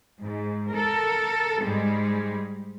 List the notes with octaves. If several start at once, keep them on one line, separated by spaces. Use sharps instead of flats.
G#2
A4 A#4
G#2 G3 G#3